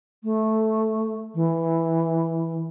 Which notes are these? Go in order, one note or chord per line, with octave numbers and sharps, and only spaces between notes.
A3
E3